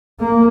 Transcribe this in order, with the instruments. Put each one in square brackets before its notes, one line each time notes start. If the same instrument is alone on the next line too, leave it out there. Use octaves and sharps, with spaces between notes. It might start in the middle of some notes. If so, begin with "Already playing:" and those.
[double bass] A#3